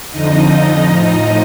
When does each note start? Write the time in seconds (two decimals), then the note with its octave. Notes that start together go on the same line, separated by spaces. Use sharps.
0.11 F2 D3 F3 D#4 D#5
0.84 A2 F3